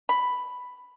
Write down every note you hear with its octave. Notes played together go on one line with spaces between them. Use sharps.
B5